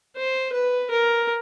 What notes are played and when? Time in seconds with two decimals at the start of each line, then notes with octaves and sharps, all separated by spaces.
0.16 C5
0.53 B4
0.90 A#4